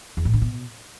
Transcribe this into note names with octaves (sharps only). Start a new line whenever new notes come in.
E2
A2
D3
B2